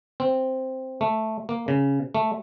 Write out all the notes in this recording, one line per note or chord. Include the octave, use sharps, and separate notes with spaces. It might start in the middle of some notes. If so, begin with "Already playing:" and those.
C4
A3
A#3
C#3
A3